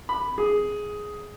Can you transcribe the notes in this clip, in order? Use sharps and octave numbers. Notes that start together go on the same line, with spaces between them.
B5
G#4